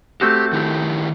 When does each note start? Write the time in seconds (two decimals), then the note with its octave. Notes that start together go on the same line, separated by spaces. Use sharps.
0.21 A3 C4 F#4 G4
0.53 D#3 E4 G4